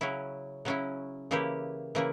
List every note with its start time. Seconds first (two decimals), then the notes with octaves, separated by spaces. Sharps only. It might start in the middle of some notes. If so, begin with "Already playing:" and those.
0.01 C#3 F#3 C#4 E4
0.65 C#3 F#3 C#4 E4
1.31 C#3 E3 A#3 E4 G4
1.95 C#3 E3 A#3 E4